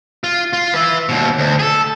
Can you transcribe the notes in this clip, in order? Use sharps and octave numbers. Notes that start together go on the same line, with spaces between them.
F4
F4
B4 E5
D#2 B2
D2
G#4 A4